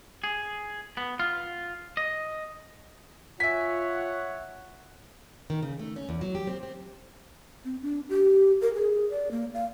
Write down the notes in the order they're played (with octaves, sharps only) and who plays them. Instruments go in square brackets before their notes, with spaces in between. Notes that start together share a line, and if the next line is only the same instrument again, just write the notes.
[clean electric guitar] G#4
B3
F4
D#5
[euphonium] F4 [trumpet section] C#5 F#5 [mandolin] E5 G#5 [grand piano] B6
[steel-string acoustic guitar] D#3
C#3
A3
C#4
E2
F#3
G4
C4
C4
[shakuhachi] C4
D4
G4
A#4
G#4
D5
A#3
F5